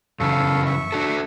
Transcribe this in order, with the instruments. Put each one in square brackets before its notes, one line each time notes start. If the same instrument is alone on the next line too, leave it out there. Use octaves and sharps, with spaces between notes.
[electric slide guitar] F#2 C#3 E3 [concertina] A4 F5 C#6
[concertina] E5 C#6
[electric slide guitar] D4 F#4 A4